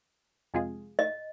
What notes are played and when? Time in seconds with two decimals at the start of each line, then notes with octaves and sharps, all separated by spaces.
0.54 F2 C3 G#3 F4 G#4
0.99 D#5